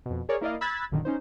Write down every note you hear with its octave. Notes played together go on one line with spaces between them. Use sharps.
F2 B2
G#4 A#4 C#5 D5
A#3 E4 A#4 D5 D#5 F5
B5 E6 F#6 G#6 A6 B6
G1 F#2 A#2 D3 D#3
C#4 D#4 C5